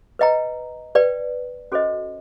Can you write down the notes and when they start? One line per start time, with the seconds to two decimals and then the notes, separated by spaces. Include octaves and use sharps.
0.19 B4 D#5 G5 A#5
0.95 B4 D5 G5
1.72 C#4 F#4 A4 C5 D#5